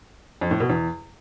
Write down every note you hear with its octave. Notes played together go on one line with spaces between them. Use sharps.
F2
A2
B2
E2